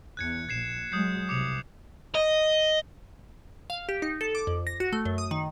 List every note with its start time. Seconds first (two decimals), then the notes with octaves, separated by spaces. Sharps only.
0.17 E2 F#6 G#6 C#7
0.49 A#1 G#6 C7 E7
0.92 F#3 G#3 D#6 G6 C7
1.29 C2 C3 D6 C#7 F7
2.15 D#5
3.70 F5
3.89 G4
4.02 D#4
4.21 A4
4.35 D6
4.47 F2
4.67 A#6
4.80 F#4
4.93 A3
5.05 F#2
5.18 D#6
5.31 D#3